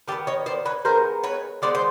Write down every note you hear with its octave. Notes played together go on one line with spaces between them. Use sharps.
D#3 G#3 B3 G4 A4
C#5 D#5
C5 D5
B4 C#5
D#3 G#3 B3 A#4 C5
B4 C#5
D#3 G#3 B3 C5 D5
C5